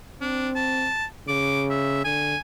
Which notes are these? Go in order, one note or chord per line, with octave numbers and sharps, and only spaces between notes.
C4 D4
A5
C#3 D6
E5
D3 G#5